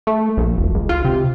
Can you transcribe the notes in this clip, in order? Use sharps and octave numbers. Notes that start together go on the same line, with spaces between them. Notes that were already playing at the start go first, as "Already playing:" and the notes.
A3
A#1
E1
C#2
F4
C3